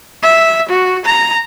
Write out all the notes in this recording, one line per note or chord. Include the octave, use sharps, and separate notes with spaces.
E5
F#4
A#5